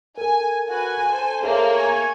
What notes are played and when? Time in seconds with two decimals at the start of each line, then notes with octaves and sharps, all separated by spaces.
0.18 A4 A#4 G#5
0.69 F#4 B4 G#5
1.08 A4 C5
1.43 A#3 G#4 C#5 E5
1.74 G#5 C#6